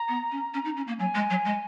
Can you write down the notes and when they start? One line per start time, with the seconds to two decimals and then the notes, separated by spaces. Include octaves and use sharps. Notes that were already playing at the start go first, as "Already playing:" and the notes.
Already playing: A#5
0.09 B3
0.31 C#4
0.54 C#4
0.65 D#4
0.77 C#4
0.87 A#3
0.99 F#3 G#5
1.15 G#3
1.30 F#3
1.45 G#3